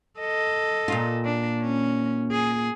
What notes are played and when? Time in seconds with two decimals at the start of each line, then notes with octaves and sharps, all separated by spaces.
0.20 A4 D#5
0.88 A#2 F4
1.25 D4
1.62 C#4
2.32 G#4